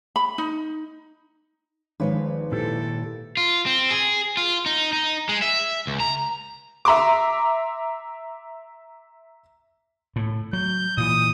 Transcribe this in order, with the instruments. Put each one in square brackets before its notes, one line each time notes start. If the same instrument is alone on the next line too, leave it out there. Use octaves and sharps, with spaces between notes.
[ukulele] B5
D#4
[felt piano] G#1 C#5 [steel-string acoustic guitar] F3 G#3 B4
[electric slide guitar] A#2 E4 G4 [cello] A4
[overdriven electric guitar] F4
C4
G#4
F4
D#4
D#4
G#3
E5
C#2
A#5
[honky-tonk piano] E5 A#5 C6 D6
[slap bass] A2
[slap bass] F#3 [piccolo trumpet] G6
[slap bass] A#2 E3 [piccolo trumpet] D#6